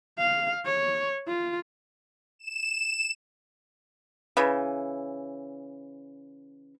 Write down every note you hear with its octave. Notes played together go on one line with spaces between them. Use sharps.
F5
C#5
F4
E7
C#3 E3